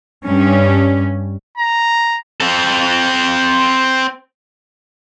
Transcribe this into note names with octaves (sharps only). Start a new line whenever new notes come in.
G2 C#4
A#5
C4 A4